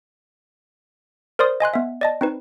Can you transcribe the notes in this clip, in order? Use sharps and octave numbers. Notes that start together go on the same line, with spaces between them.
A#4 C5 D5 C6 D#6
D#5 G#5 C6 F#6
B3 E5
D5 D#5 A5
C4 D#4 B4